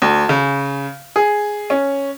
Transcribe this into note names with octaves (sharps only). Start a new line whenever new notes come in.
D2
C#3
G#4
C#4